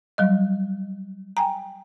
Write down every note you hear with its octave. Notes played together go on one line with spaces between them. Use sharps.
F#3 G3 D#5
G5 G#5 A#5